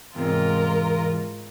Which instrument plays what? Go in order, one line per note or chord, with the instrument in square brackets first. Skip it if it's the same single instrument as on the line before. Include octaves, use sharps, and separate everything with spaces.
[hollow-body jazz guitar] E2 C3 [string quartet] G#2 F4 A#4